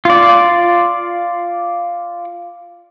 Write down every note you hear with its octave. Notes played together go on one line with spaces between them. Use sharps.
F4 D5